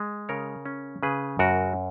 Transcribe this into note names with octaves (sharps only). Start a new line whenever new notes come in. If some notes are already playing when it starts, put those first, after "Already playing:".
Already playing: G#3
C#3 A#4 C#5
C#4
C#3 G#4 B4
F#2 F#4 A#4